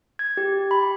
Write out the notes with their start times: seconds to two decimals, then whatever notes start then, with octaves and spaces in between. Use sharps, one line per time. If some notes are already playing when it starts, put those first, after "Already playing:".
0.19 G#6
0.37 G4
0.71 B5